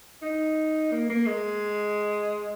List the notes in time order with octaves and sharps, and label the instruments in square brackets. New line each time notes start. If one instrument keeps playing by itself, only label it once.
[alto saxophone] D#4
A#3
A#3
G#3